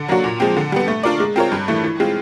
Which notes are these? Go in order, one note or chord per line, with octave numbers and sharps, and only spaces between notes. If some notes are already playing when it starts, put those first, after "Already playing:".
Already playing: D3
F#3 A#3 D4 F#4
A#2
F3 G#3 C4
D3
G3 B3
A3
D4 F4 A#4 D5
G#3
C4 F4 A#4 C#5
G2
E3 A3
E3
G#3 C4 F4